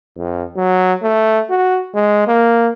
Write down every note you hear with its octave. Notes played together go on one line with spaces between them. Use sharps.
F2
F#3
A3
F#4
G#3
A#3